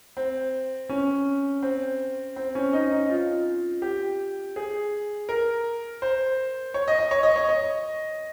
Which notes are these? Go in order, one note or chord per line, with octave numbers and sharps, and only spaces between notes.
C4
C#4
C4
C4
C#4
D#4
D#4
F4
G4
G#4
A#4
C5
C#5
D#5
D#5
C#5
D#5
C#5
D#5